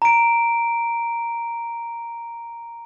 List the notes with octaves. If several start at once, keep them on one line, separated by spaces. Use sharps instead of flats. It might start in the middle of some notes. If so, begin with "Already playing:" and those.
A#5 D7